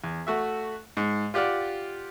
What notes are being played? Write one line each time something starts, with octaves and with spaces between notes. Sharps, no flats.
E2
A3 F#4 E5
G#2
F4 G4 D5 F#5 F6